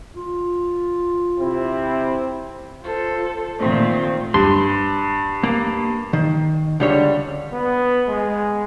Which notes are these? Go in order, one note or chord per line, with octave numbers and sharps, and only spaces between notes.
F4
C3 C4 E4
F4 A4 C5
A#2 D#3 A3 C4 F4
G2 C6
A#3
D#3
C#2 D3 G3 C#5
B3
G#3